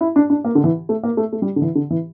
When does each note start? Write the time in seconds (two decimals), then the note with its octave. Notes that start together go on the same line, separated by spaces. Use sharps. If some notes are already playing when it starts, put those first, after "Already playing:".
0.01 E4
0.16 D4
0.30 D4
0.45 A#3
0.55 D3
0.64 E3
0.89 A3
1.04 A#3
1.17 A3
1.33 A3
1.42 G3
1.56 D3
1.62 E3
1.75 D3
1.91 E3